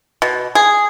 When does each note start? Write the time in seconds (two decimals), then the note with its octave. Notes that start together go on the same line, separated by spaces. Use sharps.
0.22 B2
0.55 G#4